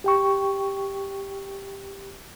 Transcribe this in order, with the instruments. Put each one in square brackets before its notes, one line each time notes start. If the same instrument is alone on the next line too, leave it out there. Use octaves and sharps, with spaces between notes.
[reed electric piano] G4 G5 C#6